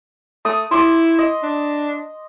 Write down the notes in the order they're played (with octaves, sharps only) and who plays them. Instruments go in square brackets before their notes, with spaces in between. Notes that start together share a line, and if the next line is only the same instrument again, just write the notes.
[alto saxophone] A3 [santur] D#6
[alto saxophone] E4 [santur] C6 D6
[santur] D#5
[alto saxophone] D4